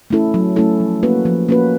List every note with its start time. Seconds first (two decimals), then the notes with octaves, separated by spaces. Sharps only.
0.10 A3 C#4 E4 A4
0.34 F#3
0.56 A3 C#4 E4 A4
0.80 F3
1.03 A#3 C#4 F#4 B4
1.25 F3
1.49 A#3 C#4 F#4 B4